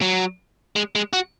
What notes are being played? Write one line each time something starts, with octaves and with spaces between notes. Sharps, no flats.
F#3
G#3
G#3
F#4